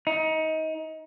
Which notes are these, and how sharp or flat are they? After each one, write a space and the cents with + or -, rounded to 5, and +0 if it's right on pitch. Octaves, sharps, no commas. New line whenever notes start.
D#4 +25